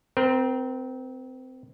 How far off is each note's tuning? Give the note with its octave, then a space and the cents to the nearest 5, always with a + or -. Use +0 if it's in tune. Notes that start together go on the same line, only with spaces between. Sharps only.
C4 -20 A#4 +30